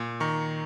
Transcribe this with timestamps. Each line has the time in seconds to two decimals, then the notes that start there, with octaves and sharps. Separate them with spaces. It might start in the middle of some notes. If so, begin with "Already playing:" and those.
Already playing: A#2
0.20 D#3 A#5 C#6